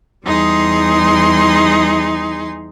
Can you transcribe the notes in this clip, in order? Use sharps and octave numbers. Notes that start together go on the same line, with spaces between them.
E2 G3 D#4 G#4 C6